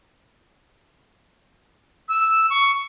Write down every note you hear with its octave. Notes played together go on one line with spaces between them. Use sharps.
E6
C#6